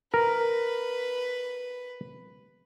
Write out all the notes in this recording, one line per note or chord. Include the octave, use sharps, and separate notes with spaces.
A#4 B4